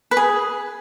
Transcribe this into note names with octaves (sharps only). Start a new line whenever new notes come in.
B4
G#4